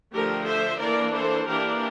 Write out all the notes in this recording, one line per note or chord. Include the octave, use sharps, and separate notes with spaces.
D3 F3 A3 G4 A#4
C5 E5
E3 A#3 D4 A#4 D5
A4 C5
E3 A#3 D4 G4 A#4